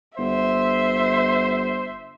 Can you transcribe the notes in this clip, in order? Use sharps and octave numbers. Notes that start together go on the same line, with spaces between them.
G1 C5 E5